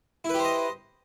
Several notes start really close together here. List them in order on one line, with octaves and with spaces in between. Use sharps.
E4 B4 G4 C5 D#5